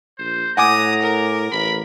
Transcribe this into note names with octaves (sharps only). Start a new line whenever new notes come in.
A#1 C5
A2 F#5 G#5 A#5 D6 D#6
A#4
A1 B5